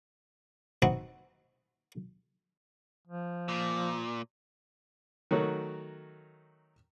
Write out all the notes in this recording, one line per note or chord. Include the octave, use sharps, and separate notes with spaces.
C4 D#4 F#4 B4 E5 F#5
F3
A#2
D#3 F#3 A3 F#4